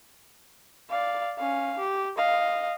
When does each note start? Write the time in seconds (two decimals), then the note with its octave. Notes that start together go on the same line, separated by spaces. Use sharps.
0.90 D5 F5
1.38 C#4 F5
1.78 G4
2.17 D#5 F5